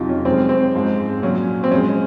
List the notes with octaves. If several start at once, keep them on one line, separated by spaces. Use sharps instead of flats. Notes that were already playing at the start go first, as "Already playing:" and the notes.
Already playing: F2 C3 F#3 D#4 F4
C#4
F#2 F3 G#3 C4
C4
G#2 F3 G#3
A#2 F#3 C#4
C4
F#2 F3 G#3 C#4